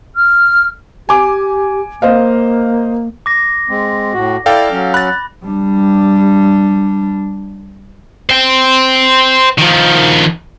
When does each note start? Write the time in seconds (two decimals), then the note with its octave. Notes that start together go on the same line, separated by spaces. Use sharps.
0.15 F6
1.09 G4 G#5 D6
2.02 A#3 C5 D#5 F5
3.26 D6 A#6
3.69 G#3 C4
4.13 A2 F#4
4.46 E4 A4 D5 F5 G5
4.71 F#3 C#4
4.94 B5 F#6 A6
5.45 G3 D4
8.30 C5 G5
9.58 D#3 F3